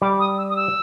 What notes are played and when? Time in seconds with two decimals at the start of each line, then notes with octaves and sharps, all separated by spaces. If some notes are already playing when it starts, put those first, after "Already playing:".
0.01 G3 D6
0.19 D#6
0.38 E6
0.49 D#6
0.56 E6